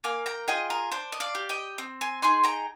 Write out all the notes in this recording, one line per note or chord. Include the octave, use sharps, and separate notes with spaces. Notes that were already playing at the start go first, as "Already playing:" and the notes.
A#3 F5 G#5
G5 A#5
F4 G#4 D#5 G5
A#4
D4 C5
D#5
D5 F5
G4
D#5 G5
C4
G#5 C6
D#4 G#4 G#5 C6
G5 A#5